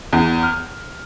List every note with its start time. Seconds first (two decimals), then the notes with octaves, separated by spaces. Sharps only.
0.13 E2
0.43 F6